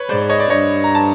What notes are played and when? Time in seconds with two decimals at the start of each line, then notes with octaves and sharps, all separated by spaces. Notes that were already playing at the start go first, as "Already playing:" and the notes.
Already playing: B4 C#5
0.09 G#2 C5 D5
0.29 C#5 D#5
0.39 D5
0.50 G2 C#5 D#5
0.84 A#5
0.95 A5